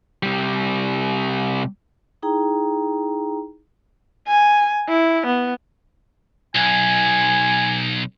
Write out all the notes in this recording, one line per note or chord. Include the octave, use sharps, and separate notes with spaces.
C3 G3
D#4 E4 G#4 G5 A#5
G#5
E4
B3
B1 G#5